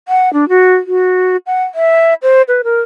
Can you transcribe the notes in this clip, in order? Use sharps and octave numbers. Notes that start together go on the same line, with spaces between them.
F#5
D4
F#4
F#4
F#5
E5
C5
B4
A#4